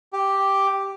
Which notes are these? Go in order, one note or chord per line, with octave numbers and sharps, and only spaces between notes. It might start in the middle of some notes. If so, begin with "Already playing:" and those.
G4